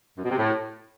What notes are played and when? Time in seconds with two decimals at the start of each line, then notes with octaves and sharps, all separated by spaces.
0.17 F#2
0.24 B2
0.31 C3
0.38 A2